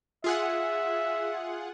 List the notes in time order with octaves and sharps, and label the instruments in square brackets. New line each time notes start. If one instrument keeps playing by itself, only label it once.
[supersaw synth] F4 G#4 F#5 [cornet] E5